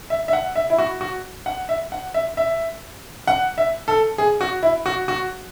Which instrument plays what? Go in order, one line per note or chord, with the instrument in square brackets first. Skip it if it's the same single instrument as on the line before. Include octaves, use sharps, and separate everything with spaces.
[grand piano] E5
E5
F#5
E5
E4
F#4
F#4
F#5
E5
F#5
E5
E5
F#5
E5
A4
G#4
F#4
E4
F#4
F#4